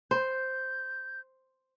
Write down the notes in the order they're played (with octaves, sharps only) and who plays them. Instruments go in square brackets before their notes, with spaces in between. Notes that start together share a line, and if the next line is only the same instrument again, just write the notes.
[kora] C5 [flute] G6